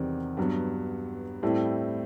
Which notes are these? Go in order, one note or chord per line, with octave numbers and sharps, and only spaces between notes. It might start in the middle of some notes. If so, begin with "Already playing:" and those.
Already playing: E2 C3 D#3 G3 C4
G2 F#3 B3
A2 G3 C4 E4 A4